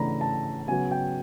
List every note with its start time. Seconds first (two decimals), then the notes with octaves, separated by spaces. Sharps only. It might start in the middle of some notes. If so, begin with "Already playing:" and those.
Already playing: C#3 E3 A3 D4 A#5 B5
0.21 A5
0.68 C#3 F#3 B3 G#5
0.91 G5